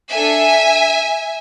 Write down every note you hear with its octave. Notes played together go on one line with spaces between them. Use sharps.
D4 A4 E5 G#5